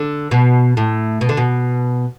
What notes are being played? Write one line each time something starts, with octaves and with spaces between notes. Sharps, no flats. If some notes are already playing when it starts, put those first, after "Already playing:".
Already playing: D3
B2
A2
B2
D3
B2